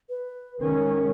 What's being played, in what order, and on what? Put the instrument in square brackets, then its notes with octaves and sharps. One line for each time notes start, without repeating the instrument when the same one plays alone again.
[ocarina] B4
[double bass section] D#3 G#3 C#4 [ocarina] A#4